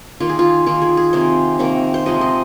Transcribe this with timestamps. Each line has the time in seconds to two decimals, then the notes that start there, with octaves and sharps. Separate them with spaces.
0.20 D#3 A#3 F4
0.29 G#4
0.39 F4
0.66 D#3 A#3 F4
0.82 G#4
0.97 G#4
1.13 C3 D#3 A#3 C5
1.59 C3 D#3 A#3
1.94 C5
2.06 C3 F3 G#3 D#5
2.21 D#5